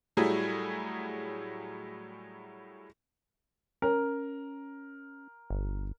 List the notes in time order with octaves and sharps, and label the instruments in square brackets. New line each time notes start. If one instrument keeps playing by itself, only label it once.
[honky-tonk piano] A2 F#3 G3 E4 G#4
[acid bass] C#4 [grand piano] A#4
[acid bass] G1